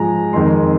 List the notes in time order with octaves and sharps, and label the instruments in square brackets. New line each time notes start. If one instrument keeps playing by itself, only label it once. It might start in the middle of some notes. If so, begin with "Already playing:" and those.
Already playing: [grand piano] G#2 F3 G#3 G#5 A#5
F2 D#3 G#3 C6